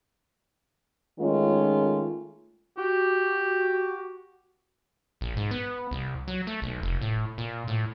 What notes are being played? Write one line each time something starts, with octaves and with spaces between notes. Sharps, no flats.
D#3 G#3 A3 C#4 D#4 F4
F#4 G4
A#1
G#2
B3
C2
F#3
A3
B1
F1
A2
A#2
A2